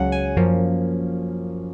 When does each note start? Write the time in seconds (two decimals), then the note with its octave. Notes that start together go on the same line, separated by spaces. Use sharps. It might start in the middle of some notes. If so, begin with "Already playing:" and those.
Already playing: C#2 C#3 F#3 C#4 F#5
0.12 G#5
0.36 F#2 F3 A#3 C#4